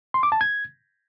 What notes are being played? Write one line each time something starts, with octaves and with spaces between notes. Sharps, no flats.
C6
D6
A5
G#6